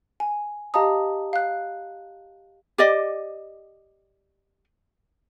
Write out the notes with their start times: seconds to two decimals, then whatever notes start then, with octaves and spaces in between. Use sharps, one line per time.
0.20 G#5
0.74 G4 D#5 F5 A5 A#5 D#6
1.33 F5 F#6
2.78 G4 D5 D#5